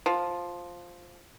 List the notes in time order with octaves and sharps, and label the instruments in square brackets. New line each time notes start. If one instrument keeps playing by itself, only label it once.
[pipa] F3